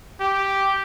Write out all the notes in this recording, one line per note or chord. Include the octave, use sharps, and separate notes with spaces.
G4